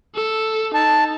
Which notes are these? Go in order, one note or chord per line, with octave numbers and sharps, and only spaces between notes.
A4
D#4 A5